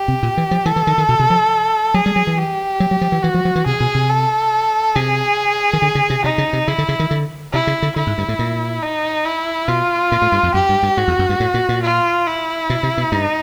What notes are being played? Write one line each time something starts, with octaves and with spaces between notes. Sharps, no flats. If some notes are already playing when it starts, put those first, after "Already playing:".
Already playing: G4
C3
A#2
E3
F3
E3 A4
E3
D#3
D#3
B2
C3
F3
F#3 G#4
G3
F#3
E3
G4
F#3
F#3
F3
E3
E3 F#4
F3
F3
E3
C3 G#4
B2
C3
A4
C3 G#4
D#3
D3
C#3
C3
C3 D#4
C#3
C3
C#3 E4
D3
C#3
D#3
D3
C3 E4
C#3
D3
D3 E4
G#2
G2
A2
A#2
D#4
E4
B2 F4
A#2
A2
G2
F2
F#2 G4
G2
G2
G#2 F#4
E2
F#2
G2
A2
A#2
A#2
F4
E4
B2
C3
B2
G2 D#4